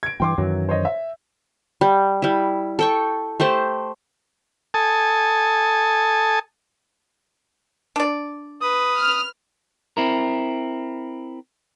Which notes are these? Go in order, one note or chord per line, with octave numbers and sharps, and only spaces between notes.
G#6 D7
G2 E3 G5 C6 D6
F#2 D#3 E3 F#3
C5 C#5 D#5
E5
G3
G3 E4
A4 G5 C#6
A3 G4 C5 A5
A4 G#5 A5 D#6
D4 D5
B4 D#6
F6
C4 E4 A#4